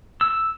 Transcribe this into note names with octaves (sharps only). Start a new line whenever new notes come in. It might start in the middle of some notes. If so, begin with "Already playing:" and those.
E6